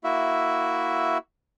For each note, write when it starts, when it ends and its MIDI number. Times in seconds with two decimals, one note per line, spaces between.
0.04 1.18 58
0.04 1.18 64
0.04 1.18 66
0.04 1.18 76